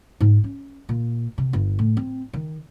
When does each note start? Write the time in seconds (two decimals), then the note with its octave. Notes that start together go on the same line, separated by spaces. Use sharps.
0.20 G#2
0.44 C#4
0.89 A#2
1.38 C3
1.53 G1
1.79 A2
1.97 C4
2.33 D#3